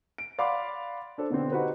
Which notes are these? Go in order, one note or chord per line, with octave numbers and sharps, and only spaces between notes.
D7
D5 F5 F#5 B5 C6 D6
D4 A4 C5
B2 D3 B3 C4
D#4 F#4 G4 B4 C5